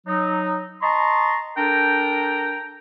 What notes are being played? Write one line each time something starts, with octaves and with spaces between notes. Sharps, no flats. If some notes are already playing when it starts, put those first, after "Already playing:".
F#3 D#4
D#5 A5 A#5 C6 C#6
D4 A4 A#4 G5 A#5